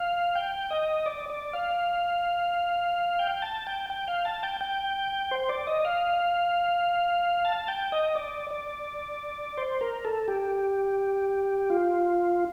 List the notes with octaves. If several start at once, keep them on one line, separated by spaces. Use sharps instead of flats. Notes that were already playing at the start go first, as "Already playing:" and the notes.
Already playing: F5
G5
D#5
D5
D5
F5
G5
A5
G5
G5
F5
A5
G5
G5
C5
D5
D#5
F5
A5
G5
D#5
D5
D5
C5
A#4
A4
G4
F4